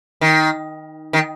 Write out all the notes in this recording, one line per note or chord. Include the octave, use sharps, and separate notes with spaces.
D#3
D#3